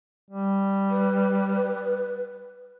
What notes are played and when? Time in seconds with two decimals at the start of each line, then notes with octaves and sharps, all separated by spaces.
0.31 G3
0.91 B4